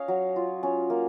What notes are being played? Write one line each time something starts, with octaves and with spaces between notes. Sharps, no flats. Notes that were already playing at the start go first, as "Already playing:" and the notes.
Already playing: C#4 C#5 D#5 F5
F#3
F4
C#4
A#3